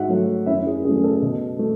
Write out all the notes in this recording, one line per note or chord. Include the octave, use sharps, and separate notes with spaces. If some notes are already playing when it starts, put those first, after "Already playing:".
Already playing: G#2 F#4 E5 F#5
F#3 A3
F#2 E4 E5
G#4
C#3 F#3 A3 G#4
A4
B2
A3